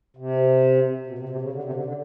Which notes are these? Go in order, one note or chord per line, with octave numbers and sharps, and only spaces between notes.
C3
B2
C3
C3
C#3
D3
C3
D3
D3